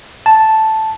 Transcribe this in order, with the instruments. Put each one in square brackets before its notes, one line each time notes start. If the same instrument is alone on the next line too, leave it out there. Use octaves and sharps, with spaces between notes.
[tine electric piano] A5